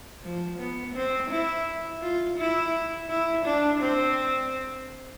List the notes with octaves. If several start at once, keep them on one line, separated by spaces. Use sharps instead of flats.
F3
B3
C4
E4
F4
E4
E4
D4
C4